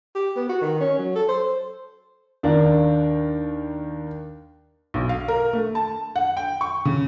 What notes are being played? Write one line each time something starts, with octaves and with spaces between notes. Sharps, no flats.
G4
B3
F#4
D#3
C#4
F#3
A4
C5
D#2 D4 A#4 D5 F5
B1
F5
A#4
A3
A5
F#5
G5
C#6
C#3